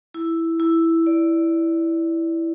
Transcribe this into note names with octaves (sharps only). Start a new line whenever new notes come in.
E4
E4
D5